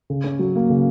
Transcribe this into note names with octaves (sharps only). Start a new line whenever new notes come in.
C#3
C#4
F#3
A#3
C#3